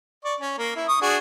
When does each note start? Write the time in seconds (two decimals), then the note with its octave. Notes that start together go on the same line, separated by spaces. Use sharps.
0.25 D5 C#6
0.40 C#4
0.59 A#3
0.76 E4
0.88 C#6 D#6
1.02 D4 F#4 G#4